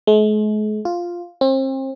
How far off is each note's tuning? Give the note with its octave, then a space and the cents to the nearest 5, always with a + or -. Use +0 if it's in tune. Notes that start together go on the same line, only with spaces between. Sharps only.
G#3 +45
F4 +0
C4 +35